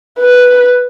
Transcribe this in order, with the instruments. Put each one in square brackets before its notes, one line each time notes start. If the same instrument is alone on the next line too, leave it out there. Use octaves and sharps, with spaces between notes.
[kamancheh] B4